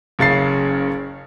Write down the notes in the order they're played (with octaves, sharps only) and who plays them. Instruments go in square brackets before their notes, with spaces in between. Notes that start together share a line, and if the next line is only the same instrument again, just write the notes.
[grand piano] F#1 C#3 A6 C7